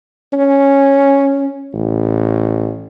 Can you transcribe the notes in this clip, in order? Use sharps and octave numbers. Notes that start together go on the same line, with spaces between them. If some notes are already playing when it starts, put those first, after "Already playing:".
C#4
A1